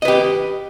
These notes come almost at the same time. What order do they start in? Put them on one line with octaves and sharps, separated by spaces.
D#5 B4 G4